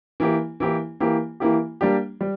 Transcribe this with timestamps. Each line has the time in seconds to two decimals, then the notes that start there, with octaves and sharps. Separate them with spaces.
0.20 E3 A#3 E4 G4
0.60 E3 A#3 E4 G4
1.00 E3 A#3 E4 G4
1.40 E3 A#3 E4 G4
1.81 G3 A#3 D4 G4
2.21 G3